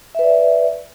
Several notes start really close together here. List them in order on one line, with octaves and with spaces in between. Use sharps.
E5 B4 D5